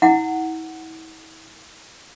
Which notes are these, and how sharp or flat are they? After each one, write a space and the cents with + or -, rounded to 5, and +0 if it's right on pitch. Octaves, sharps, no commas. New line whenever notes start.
E4 -40 F#5 +0